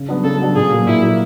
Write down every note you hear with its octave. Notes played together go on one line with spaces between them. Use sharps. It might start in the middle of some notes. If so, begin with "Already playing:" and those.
Already playing: C#3
F#3 B3 D4
C#3 A4
F#3 B3 D4
A#2 G#4
F#3 A#3
A#2 E4
F#3 A#3